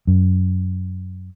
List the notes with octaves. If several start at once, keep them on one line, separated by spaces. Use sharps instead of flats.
F#2